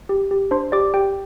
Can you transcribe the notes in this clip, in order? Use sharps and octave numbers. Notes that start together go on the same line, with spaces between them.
G4
G4
D4 C5 C6
G4 D5 D6
G4 G5